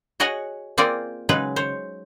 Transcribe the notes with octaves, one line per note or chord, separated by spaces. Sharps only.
F#4 G#4 C#5 D#5 F#5 G#5
A#3 C4 F4 G#4 D5
C#3 F#3 G#3 D#4 G#4 B4
C5 C#5